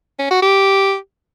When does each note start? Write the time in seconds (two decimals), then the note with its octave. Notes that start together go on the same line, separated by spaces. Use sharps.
0.19 C#4
0.31 F#4
0.42 G4